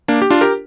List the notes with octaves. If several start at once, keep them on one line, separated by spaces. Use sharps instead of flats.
A#3 D4
G4
D4 F4
G4 A#4